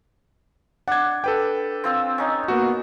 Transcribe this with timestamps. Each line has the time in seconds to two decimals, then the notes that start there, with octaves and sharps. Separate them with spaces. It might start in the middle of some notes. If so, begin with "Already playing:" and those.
0.88 D4 F#5 G#6
1.24 A4 B4 G5
1.84 C4 F4 E6
2.18 C#4 D#4
2.48 A#3 B3 F#4